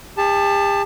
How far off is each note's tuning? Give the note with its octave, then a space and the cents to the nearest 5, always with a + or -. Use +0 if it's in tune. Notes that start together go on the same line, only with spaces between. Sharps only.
G4 +40 A5 +0